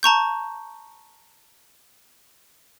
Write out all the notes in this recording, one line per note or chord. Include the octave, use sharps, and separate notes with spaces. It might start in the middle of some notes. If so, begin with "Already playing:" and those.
A5 A#5 C#6 G6